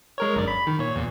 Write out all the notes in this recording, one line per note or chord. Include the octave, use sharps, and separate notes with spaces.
G#3 A#4 C#5
G1 F#2 D5
B5
D#3
A#2 C#5
E2 A#2